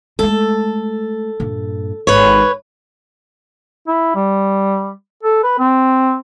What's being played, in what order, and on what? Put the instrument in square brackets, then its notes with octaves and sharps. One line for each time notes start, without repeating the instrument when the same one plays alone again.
[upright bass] G#3 A3 [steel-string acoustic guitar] A4
[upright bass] G2 A#2
[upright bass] G#1 [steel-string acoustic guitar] B4 C#5
[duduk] E4
G3
A4
B4
C4